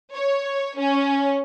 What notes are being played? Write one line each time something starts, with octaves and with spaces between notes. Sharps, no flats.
C#5
C#4